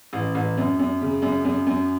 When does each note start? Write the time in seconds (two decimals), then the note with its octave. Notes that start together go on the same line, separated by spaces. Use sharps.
0.13 A1
0.35 A1
0.57 F#2
0.79 F#2
1.01 C#3
1.22 F#2
1.45 F#2
1.67 F#2